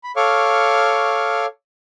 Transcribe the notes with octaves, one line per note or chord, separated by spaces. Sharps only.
B5
A4 C#5 F5 C#6 D6 F6